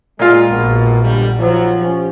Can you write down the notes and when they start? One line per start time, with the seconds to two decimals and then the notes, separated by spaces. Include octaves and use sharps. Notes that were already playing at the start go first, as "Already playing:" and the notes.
0.19 A#2 G#3 F4
0.50 A#1 B2 G#3 A#3
1.03 B2 D3 G3
1.39 B1 F3 F#3
1.80 C#4 G4